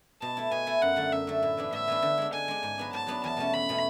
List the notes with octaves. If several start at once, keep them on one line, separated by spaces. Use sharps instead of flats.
B2 A5
A3 E4
B2 G#5
A3 E4
F#2 F#5
D3 A3
F#2 E5
D3 A3
A2
E3 B3 D4
A2 E5
E3 B3 D4
D3
G#3 D4
D3 G#5
G#3 D4
G#2
F#3 B3 D4
G#2 A5
F#3 B3 D4
E2 A5
B2 A3 C#4
E2 B5
B2 A3 C#4